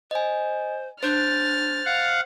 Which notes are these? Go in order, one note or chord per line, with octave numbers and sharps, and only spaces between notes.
C5 D#5 G#5
D4 C5 F6 G6 A6
F5 F#5